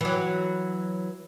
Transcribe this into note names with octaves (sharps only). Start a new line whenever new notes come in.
E3 F#3